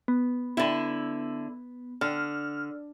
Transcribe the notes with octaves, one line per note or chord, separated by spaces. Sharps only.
B3
D3 E4
D3 F6